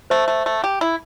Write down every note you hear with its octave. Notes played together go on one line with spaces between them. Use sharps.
A3 C5 E5
A3
A3
G4
E4